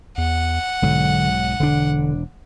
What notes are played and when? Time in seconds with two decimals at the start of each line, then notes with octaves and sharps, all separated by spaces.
0.18 E2 F#5
0.82 B1 G#2 D3 F#3
1.60 E1 D3 D4